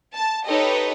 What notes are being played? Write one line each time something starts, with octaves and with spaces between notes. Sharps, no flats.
A5
D#4 G4 A4 B4 C#5 D#5